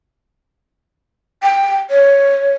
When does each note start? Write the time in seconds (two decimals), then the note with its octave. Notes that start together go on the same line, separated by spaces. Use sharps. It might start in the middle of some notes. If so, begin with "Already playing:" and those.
1.43 G5
1.90 C#5